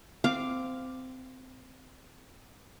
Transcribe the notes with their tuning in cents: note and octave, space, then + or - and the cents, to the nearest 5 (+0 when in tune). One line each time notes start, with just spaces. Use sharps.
C4 -20 F5 +0 D6 +0